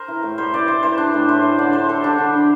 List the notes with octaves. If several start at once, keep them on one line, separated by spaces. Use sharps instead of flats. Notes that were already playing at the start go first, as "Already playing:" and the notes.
Already playing: A#4 C5
E3
A2
G3 C5
E3 D5
E3 C5
E3 C5
G3 D4
A2
A2 C5
A2
D3 D5
G3 C5
G3 A4
G3 D4
D3
D3